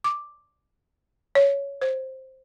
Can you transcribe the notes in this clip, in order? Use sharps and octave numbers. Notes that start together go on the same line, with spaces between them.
D6
C#5
C5